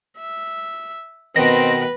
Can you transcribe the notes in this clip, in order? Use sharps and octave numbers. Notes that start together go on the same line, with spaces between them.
E5
B2 D#3 C4 B4 A#6